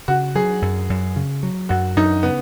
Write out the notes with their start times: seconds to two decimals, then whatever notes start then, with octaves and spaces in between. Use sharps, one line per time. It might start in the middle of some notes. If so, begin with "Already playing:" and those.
0.08 C#3 F#4
0.35 F#3 G#4
0.62 F#2
0.90 F#2
1.16 C#3
1.43 F#3
1.69 F#2 F#4
1.97 F#2 D#4
2.23 C#3 B3